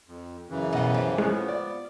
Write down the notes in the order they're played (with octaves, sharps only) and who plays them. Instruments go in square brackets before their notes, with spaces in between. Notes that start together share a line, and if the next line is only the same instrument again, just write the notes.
[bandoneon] F2
F#2 C#3 E3
[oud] B2 G3 [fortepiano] D#5 F#5
[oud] F3 G4
[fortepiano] A2 C#4 F#6 [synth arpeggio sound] G#3 [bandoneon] B3
[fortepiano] D5